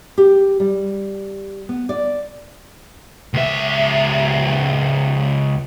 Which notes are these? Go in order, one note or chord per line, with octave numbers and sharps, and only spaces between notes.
G4
G3
B3
D5
C#2 E5